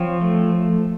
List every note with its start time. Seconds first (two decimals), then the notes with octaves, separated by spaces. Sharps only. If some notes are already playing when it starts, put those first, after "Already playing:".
Already playing: F3 C4 C#5
0.21 A3